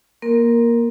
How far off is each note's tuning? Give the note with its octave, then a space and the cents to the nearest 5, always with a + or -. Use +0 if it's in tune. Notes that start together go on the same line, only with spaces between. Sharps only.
A#3 +15 A#4 +0